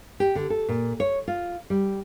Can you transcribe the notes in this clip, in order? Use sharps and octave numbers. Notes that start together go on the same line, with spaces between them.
G4
D3
A4
A#2
C#5
F4
G3